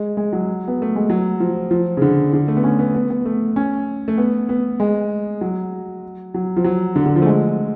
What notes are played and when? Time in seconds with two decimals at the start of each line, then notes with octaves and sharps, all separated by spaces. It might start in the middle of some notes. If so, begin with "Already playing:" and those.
Already playing: G#3
0.17 G#3
0.33 F#3
0.68 B3
0.82 A3
0.95 G#3
1.10 F#3
1.40 F3
1.71 F3
1.97 C#3
2.02 D3
2.33 D3
2.48 A3
2.57 B3
2.64 C#4
2.79 B3
2.95 B3
3.10 B3
3.26 A3
3.56 C#4
4.08 A3
4.18 B3
4.49 B3
4.80 G#3
5.41 F#3
6.34 F#3
6.56 F3
6.64 F#3
6.96 D3
7.06 D3
7.16 F3
7.22 A3
7.26 G#3